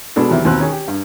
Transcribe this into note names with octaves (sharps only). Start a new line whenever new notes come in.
B2 G#3 B3 D4 A4
E2 C3 D#3 E3 F#3
D#2 B2 C4 E6 F#6
D#3 C#4 G#4
G4
G2